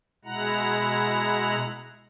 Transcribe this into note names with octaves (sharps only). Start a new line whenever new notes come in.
B2 G#3 E4 F#5 A#5